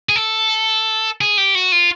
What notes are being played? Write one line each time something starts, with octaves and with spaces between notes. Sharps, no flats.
G#4
A4
G#4
G4
F#4
F4